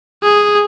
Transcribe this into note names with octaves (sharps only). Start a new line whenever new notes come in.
G#4